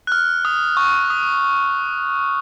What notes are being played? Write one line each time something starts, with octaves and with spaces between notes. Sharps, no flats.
F#6
F6
D#6
C#6
D#6